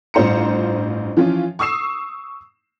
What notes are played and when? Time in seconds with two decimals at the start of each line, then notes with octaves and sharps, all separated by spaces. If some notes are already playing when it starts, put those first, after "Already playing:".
0.14 A1 G2 F4 C5 A#5 C#7
1.17 E3 F3 C#4 F4
1.59 C#6 D#6 E6 C7 E7